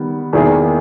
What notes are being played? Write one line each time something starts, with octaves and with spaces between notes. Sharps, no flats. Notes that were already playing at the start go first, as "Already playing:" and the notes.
Already playing: D#3 G3 B3
E2 D#3 A#3 E4 G#4